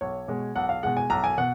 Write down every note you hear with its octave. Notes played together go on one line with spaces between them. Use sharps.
B1 C#5
B2 G#3
B1 F#5
F5
B2 G#3 F#5
G#5
B1 A#5
G#5
B2 F#5